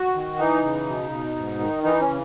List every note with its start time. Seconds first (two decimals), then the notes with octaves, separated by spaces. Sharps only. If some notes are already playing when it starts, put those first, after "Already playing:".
Already playing: F#4
0.15 D#3
0.39 E3 D#4
0.63 C#3
0.87 B2
1.11 B2
1.36 G#2
1.60 D#3
1.83 E3 D#4
2.00 C#4
2.09 C#3